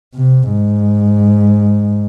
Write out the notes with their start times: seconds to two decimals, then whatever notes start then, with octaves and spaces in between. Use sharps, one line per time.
0.15 C3
0.51 G#2